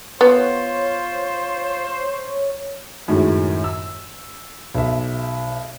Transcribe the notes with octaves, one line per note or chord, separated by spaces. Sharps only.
B3 F4 C5 C#5
F#2 A2 D#3 F#3 G#3
E6
B1 E5